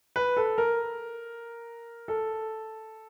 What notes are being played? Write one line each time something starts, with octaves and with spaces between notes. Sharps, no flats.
B4
A4
A#4
A4